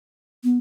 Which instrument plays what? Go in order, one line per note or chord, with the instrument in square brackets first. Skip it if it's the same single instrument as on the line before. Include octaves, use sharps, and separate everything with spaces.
[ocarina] B3